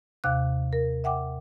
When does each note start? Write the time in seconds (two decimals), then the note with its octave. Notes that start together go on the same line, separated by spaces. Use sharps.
0.24 D#2 C3 F5 D6 F#6
0.73 A#4
1.04 E5 F#5 G5 D6